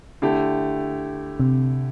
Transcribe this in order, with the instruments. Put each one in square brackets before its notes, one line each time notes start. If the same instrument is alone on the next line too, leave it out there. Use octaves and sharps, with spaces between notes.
[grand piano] D3 A3 E4 G4
[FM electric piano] C3